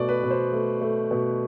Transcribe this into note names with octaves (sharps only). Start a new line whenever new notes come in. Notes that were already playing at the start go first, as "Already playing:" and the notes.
Already playing: B2 A3 D5
B4
B2
C5
A3
A3
B2